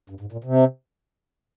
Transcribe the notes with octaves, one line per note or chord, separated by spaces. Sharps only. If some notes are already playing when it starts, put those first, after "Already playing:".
G2
G#2
A#2
C3